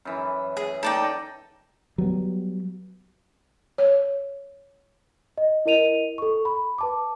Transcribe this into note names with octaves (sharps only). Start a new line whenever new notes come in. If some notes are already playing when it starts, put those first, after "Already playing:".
F#2 E3
G#4
D#4 A4 D5 D#5 G5
F#3 G3 B3
C#5
D#5
E4 A#4 D#5 D#7 F7
A4 C#6
B5
B4 A5 D6